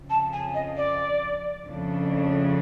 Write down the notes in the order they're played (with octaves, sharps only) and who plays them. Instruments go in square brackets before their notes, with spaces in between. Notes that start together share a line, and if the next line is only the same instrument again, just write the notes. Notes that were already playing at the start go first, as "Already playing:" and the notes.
Already playing: [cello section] F2 C#3 F3
[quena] A5
G#5
D#5
D5
[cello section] F2 C#3 F3 A3 D4